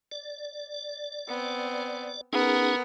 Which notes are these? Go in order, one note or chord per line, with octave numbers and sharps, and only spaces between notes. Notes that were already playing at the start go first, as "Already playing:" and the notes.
D5
B3 C4
B3 C#4 D#4 G#4 A#4